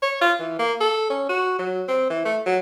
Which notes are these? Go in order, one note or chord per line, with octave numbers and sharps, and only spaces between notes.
C#5
F4
E3
A#3
A4
C#4
F#4
F#3
C4
E3
A3
F#3